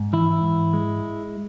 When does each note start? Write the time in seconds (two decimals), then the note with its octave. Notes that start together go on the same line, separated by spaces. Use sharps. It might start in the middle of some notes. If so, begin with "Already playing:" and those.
Already playing: G#2
0.13 E3 E4
0.43 G#2
0.73 G#3